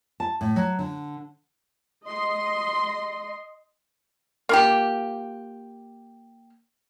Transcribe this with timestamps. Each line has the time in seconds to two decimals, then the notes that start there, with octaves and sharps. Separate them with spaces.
0.20 A5
0.41 A2
0.56 F#3
0.79 D3
2.07 D#5 C6
4.49 A#3 F4 G4